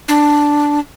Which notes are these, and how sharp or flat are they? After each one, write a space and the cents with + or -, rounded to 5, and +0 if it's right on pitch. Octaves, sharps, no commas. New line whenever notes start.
D4 +0